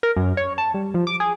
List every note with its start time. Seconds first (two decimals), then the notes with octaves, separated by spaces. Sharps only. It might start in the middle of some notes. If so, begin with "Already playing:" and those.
0.03 A#4
0.16 F#2
0.37 C#5
0.58 A5
0.74 G3
0.94 F3
1.07 D6
1.20 G#4